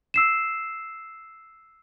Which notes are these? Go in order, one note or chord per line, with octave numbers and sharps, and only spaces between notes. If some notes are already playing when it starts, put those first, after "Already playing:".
E6 C7 E7